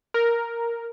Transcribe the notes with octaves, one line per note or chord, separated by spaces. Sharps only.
A#4